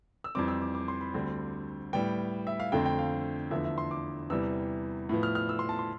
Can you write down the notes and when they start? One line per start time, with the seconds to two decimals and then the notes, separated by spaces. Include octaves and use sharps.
0.24 E6
0.35 F2 E3 G3 C4 D6
0.48 E6
0.62 D6
0.75 D6
0.88 C6
1.01 B5
1.14 D2 D3 G3 C4
1.93 A2 G3 B3 G5
2.47 E5
2.60 F5
2.72 F2 D3 A3 C4 G5
2.85 G5
2.99 F5
3.51 E2 D3 F3 A3 E5
3.65 E5
3.78 C6
3.91 D6
4.30 E2 C3 E3 G3 E6
5.09 A2 F3 B3
5.23 F6
5.35 F6
5.49 E6
5.59 C6
5.69 A5
5.79 C6